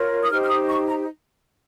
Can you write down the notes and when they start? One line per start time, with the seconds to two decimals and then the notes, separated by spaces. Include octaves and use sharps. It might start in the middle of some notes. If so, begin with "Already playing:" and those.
Already playing: F4 A#4 C#5
0.23 D#6
0.31 D#4 G4 C5 F6
0.44 F6
0.49 D#6
0.69 C#6
0.87 A#5